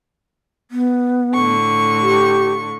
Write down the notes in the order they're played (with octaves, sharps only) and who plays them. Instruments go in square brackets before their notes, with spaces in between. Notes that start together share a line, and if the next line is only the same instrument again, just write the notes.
[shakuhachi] B3
[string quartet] A2 D3 C#6
[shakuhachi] G4